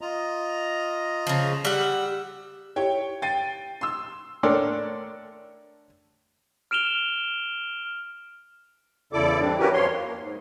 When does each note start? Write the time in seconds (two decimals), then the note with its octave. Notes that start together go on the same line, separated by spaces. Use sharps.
0.01 F4 D#5 A#5
1.27 C#3 F3
1.65 G3 F#5 E6
2.76 E4 G4 C#5 G5
3.22 G5 A6 C7 D#7
3.81 C6 E6
4.43 A2 D4 A4 A#4 C#5 C6
6.71 F6 D7 E7 F7 G7
9.13 E2 C#3 E4 A4 D5 D6
9.40 G#2 G3 C4 D4
9.59 C#4 E4 F#4 G4 A#4 B4
9.73 F2 F3 C#5 C6
9.92 A#3
10.20 G#2